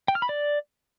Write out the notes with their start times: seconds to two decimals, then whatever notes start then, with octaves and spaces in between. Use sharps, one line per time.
0.08 G5
0.15 F6
0.22 B5
0.29 D5